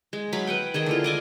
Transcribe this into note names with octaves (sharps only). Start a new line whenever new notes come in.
G#3
F#3 F5 B5
B4 F#5 G5
D#3 G#4 D#5 E5
D3 E4 F4
D5 D#5 G#5